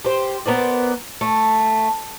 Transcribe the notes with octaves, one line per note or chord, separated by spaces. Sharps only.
G4 C5
B3 A#4 C5 D5
A3